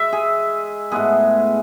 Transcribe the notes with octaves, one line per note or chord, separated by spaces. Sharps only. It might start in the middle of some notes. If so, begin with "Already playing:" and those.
Already playing: G#3 E5
G#4
A2 G#3 B3 G#4